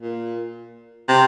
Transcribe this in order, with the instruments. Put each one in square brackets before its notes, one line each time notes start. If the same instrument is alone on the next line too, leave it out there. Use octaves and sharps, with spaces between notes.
[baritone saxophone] A#2
C3